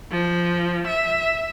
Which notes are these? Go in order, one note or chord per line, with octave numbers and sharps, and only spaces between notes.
F3
E5